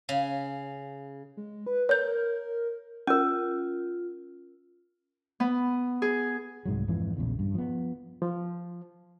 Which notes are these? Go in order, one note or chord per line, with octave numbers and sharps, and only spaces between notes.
C#3
G#3
B4
A#4 C#5 G6
C#4 F4 A#4
B3
G#4
C2 G#2 F#3
F2 G#2 E3 F3
A#1 E2 C#3
G2
F3 B3
F3